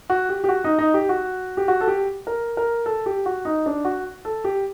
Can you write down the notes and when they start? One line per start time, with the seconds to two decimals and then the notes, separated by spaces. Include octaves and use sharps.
0.10 F#4
0.29 G4
0.44 G4
0.49 F#4
0.64 D#4
0.79 D#4
0.94 G4
1.09 F#4
1.57 G4
1.68 F#4
1.81 A4
1.88 G4
2.27 A#4
2.57 A#4
2.86 A4
3.06 G4
3.26 F#4
3.45 D#4
3.66 D4
3.85 F#4
4.25 A4
4.44 G4